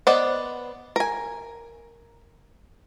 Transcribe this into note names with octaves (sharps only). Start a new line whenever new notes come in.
B3 C5 D5 D#5 F#5
A#4 G#5